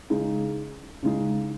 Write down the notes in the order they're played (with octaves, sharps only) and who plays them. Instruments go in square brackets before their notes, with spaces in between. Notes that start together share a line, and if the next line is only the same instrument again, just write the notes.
[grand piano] C#3 G#3 D#4 G#4
C#3 G#3 D#4 G#4